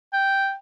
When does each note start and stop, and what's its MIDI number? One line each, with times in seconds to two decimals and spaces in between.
0.13 0.54 79